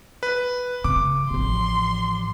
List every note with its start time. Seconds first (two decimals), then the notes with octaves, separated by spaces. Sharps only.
0.23 B4
0.84 C#3 D6
1.31 A1 F3 C6